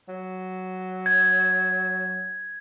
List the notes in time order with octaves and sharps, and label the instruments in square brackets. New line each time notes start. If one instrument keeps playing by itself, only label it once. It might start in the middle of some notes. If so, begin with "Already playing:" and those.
[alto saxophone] F#3
[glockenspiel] G#6